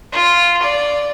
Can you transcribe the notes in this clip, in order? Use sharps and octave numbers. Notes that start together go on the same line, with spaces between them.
F4
D5